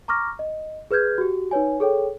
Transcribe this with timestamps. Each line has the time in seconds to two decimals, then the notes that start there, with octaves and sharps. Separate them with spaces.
0.08 A#5 C#6 D6 F6 A#6
0.39 D#5
0.91 G#4 B4 F6 G6 G#6
1.18 F#4 G4
1.51 D#4 B4 C#5 G#5
1.80 G#4 A4 C#5 G5